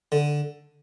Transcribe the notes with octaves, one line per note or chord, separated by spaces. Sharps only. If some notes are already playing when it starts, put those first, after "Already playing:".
D3